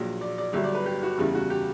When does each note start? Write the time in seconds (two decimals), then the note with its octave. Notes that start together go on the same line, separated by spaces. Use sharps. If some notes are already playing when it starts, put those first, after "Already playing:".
Already playing: A#1 A#2 F#3
0.21 D5
0.38 D5
0.53 G1 G2 F#3 E5
0.64 D5
0.75 B4
0.86 G4
1.03 F#4
1.18 F#1 E2 C#3 G3 E4
1.35 F#4
1.50 G4